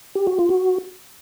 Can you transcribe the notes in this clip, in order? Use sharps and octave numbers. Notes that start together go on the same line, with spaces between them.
G4
F#4
F4
F#4